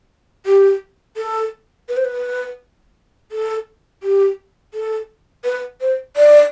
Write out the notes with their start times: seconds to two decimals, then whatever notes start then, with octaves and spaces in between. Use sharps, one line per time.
0.46 G4
1.17 A4
1.89 B4
1.97 C5
2.05 B4
3.32 A4
4.03 G4
4.74 A4
5.44 B4
5.81 C5
6.16 D5